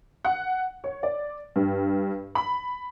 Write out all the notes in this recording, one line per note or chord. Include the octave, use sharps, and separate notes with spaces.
F#5
C#5
D5
G2
B5